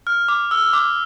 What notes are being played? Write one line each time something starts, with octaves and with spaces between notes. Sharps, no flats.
F6
D6
E6
D6